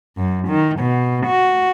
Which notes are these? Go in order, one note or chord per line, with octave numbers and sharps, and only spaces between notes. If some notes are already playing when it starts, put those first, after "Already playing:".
F#2
D#3
B2
F#4